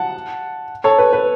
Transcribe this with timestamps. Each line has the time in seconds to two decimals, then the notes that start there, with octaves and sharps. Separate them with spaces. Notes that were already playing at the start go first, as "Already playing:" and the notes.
Already playing: F#5 A5
0.84 A4 C#5
0.98 B4
1.13 B4